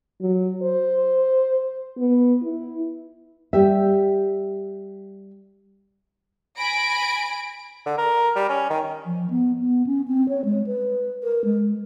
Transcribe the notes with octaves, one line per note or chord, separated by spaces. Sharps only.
F#3
C5
B3
E4
G3 G4 E5
G#5 B5 A#6 D7
D3
A#4
G3
C#4
D#3
F3
B3
B3
C#4
C4
C#5
G#3
B4
A#4
G#3